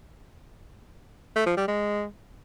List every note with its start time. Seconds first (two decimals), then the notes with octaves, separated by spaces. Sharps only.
1.36 A3
1.46 F3
1.57 G3
1.68 G#3